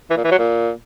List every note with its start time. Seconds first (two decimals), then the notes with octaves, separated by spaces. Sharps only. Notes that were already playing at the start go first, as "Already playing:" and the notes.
0.10 E3
0.17 A#2
0.24 E3
0.31 F#3
0.38 A#2